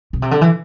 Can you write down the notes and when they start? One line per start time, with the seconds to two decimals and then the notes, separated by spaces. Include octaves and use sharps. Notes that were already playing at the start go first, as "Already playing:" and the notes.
0.13 B2
0.22 C3
0.31 D3
0.41 E3